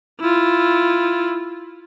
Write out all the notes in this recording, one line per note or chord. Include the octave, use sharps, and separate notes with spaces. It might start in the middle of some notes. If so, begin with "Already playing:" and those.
E4 F4